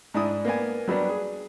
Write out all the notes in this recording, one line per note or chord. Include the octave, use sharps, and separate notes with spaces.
G#2 D4 E4 D#6
A#3 B3 D5 G#5
F#3 G3 B3 D4
G#4